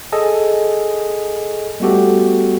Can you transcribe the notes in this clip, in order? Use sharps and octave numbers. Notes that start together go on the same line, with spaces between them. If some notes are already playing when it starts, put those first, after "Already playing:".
G#4 A4 D#5 G#5
G3 A3 B3 F#4 G4 A4